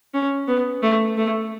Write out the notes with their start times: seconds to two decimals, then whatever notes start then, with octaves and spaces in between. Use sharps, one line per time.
0.14 C#4
0.48 B3
0.83 A3
1.17 A3